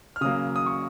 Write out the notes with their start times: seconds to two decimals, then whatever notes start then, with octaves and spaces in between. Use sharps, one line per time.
0.16 F6
0.21 C#3 F#3 A#3 D#6
0.56 D#6
0.66 C#6